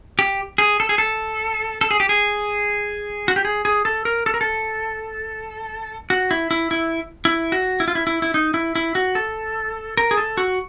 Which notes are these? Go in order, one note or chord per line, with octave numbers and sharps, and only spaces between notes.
G4
G#4
A4
G#4
A4
A4
G#4
G4
G#4
F#4
G4
G#4
G#4
A4
A#4
A4
A#4
A4
F#4
E4
E4
E4
E4
F#4
E4
F4
E4
E4
E4
D#4
E4
E4
F#4
A4
A#4
G#4
A4
F#4